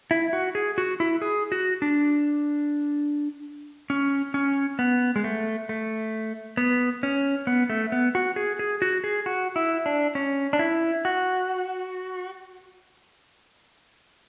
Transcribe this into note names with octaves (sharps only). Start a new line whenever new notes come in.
E4
F#4
G#4
F#4
E4
G#4
F#4
D4
C#4
C#4
B3
G#3
A3
A3
B3
C#4
B3
A3
B3
F#4
G#4
G#4
F#4
G#4
F#4
E4
D4
C#4
D4
E4
F#4